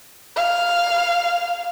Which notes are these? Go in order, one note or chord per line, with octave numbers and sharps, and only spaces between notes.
F5